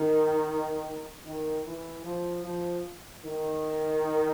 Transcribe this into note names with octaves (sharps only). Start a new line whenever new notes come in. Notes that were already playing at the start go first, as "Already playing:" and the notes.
Already playing: D#3
D#3
E3
F3
F3
D#3